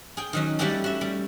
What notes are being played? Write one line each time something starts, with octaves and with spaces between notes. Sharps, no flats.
G#4 G5
D#3 F#3 C#4
G3 A3 C#4 F#4 G4 A4
F#4 E5
G3